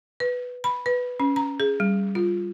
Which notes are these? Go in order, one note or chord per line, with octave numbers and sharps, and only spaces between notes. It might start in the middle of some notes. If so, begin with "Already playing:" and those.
B4
B5
B4
C#4
A#5
G#4
G3
F4